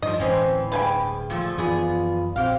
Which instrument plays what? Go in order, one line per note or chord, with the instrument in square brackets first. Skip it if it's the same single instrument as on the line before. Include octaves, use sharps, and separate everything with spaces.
[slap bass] G2 [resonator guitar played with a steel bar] D#3 F3 [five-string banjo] D#5
[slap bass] D1 G#3 [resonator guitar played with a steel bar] E3 C4 C#4 [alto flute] C5
[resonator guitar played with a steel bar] G2 G5 [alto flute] G#4 [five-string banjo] B4 G#5 B5
[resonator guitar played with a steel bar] A#2 F3 A3
[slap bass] F#2 E3 F3 [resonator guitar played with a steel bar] B3 G#4 D5 [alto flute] F4
[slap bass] A#1 [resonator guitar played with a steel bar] F#3 G4 F5 [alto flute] C4